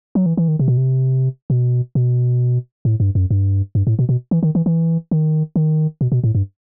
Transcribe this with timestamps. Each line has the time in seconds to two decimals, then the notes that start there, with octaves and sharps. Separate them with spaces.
0.15 F#3
0.26 E3
0.37 E3
0.48 D#3
0.59 C3
0.68 B2
0.77 C3
1.50 B2
1.95 B2
2.85 A2
3.00 G2
3.15 F#2
3.31 G2
3.75 G2
3.87 A2
3.99 B2
4.09 B2
4.31 E3
4.43 D#3
4.55 E3
4.66 E3
5.11 D#3
5.56 D#3
6.01 B2
6.12 B2
6.24 A2
6.35 G2